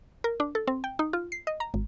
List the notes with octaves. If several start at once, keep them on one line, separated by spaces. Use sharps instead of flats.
A#4
D4
A4
C4
G5
D#4
F4
C7
D#5
A#5
G#1